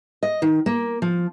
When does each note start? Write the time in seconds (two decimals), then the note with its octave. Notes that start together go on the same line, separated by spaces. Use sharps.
0.23 D#5
0.42 D#3
0.66 A#3
1.02 F3